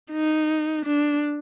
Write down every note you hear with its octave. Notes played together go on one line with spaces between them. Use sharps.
D#4
D4